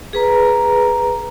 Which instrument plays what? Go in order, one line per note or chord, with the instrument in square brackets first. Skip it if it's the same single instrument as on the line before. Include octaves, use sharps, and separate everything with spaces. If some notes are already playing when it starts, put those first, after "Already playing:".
[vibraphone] G#4 B4 A#5